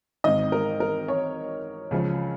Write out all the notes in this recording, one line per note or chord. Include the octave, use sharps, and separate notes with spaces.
G#1 G#2 D#3 D#5
A#4
A#4
C#5
C#2 C#3 F3